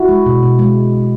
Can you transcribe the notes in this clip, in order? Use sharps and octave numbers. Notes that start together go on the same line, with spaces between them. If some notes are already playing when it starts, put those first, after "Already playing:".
Already playing: E4 F#4
G#3
B2
B2
G#3